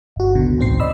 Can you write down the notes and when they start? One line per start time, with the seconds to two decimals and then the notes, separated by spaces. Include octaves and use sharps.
0.16 G1 F#4
0.35 C#2 B2 D3
0.58 A1 D2 G#2 C4 C5 C7
0.80 D5 D#5 B5 E6